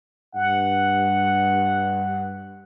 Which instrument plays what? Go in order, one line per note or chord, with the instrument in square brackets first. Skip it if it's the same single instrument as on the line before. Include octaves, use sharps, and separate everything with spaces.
[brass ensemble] G2 [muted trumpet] F#5